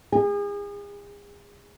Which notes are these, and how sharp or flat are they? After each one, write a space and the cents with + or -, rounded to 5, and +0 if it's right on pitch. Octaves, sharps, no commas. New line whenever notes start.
G#4 -35